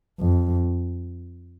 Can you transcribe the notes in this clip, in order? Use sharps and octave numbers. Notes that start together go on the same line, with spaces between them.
F2